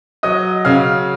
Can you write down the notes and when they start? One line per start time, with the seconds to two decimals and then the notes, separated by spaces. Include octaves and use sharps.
0.23 F#3 D#5 D#6
0.65 C#3 F5 F6